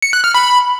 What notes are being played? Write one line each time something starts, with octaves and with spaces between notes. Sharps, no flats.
C#7
F#6
F6
B5